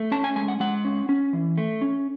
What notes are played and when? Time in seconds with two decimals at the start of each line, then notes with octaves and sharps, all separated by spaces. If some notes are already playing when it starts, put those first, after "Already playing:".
Already playing: A3
0.11 C#4 A5
0.24 G#5
0.36 G#3 G#5
0.48 F#5
0.60 G#3 F#5
0.85 C#4
1.09 C#4
1.33 E3
1.58 A3
1.82 C#4